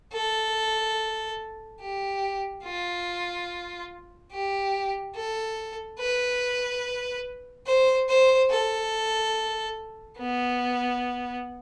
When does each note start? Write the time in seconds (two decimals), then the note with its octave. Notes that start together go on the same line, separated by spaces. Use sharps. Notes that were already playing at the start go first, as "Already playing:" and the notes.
0.13 A4
1.81 G4
2.64 F4
4.32 G4
5.16 A4
6.00 B4
7.67 C5
8.09 C5
8.50 A4
10.18 B3